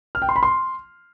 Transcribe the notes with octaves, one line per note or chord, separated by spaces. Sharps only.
F6
G5
C6
B5
C6